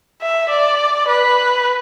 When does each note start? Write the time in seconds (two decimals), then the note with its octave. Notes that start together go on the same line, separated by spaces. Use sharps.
0.22 E5
0.50 D5
1.08 B4